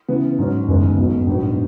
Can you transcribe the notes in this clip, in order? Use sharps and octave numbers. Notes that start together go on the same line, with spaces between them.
C#3 E3 B3
G#2 F#3 C#4
F#1 F#2 D#3 G#3 B3
B1 B2 F#3 B3
A#1 G#2 F#3 B3